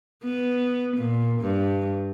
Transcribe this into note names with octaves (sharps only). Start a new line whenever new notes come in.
B3
A#2
G2